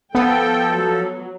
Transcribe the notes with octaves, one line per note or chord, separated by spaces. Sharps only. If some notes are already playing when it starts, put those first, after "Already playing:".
F3 B3 A4 G5
F#3